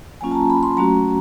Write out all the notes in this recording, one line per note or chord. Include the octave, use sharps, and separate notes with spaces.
F#3 A#3 C#4 F4 G#5
A5
A#5
B5
C6
F#3 A3 C#4 F#4 A#5